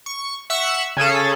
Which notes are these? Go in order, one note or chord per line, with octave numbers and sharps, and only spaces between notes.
C#6
E5 F#5 C#6 E6 C#7
C#3 C#4 G#4 A4